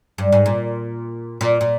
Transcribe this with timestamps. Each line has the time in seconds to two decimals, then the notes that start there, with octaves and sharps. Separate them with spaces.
0.18 G2
0.32 G#2
0.46 A#2
1.41 A#2
1.61 A#2